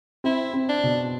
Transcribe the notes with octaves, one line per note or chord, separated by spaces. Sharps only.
C4 E4
C4
D4
B2